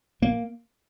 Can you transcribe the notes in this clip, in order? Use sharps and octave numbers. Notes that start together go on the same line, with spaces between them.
A#1 A#3